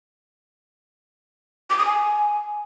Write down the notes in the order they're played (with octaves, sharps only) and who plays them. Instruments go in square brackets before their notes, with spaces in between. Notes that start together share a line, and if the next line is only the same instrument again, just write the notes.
[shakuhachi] D6
D#6
G#5